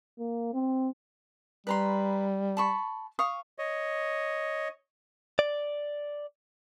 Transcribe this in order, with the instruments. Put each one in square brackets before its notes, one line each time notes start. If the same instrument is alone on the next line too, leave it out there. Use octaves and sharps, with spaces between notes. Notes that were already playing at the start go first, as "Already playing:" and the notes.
[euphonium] A#3
C4
[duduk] G3 [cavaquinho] B4 A#5 C6
[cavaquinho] A5 B5 C#6
F5 C#6 D#6
[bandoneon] C#5 D#5
[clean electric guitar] D5